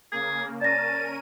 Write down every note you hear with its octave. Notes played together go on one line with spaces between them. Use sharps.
C#3 A#3 G#4
C#4 A#4 D5 A5 A6 A#6 D#7